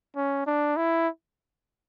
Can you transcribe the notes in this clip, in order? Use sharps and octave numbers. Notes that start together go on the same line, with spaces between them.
C#4
D4
E4